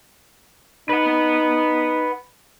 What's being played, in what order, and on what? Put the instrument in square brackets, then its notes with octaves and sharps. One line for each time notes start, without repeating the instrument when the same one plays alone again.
[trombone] D#4 [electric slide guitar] B4 F#5